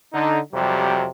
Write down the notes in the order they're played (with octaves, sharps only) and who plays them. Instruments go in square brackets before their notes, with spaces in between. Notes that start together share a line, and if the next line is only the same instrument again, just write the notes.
[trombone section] D3 D#4
F2 C3 F#3 G3